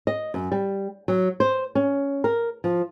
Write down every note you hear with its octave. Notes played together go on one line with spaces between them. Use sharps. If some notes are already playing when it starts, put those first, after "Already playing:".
D#5
F#2
G3
F#3
C5
C#4
A#4
F3